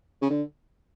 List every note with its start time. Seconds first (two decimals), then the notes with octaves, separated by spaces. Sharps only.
0.22 C#3
0.30 D3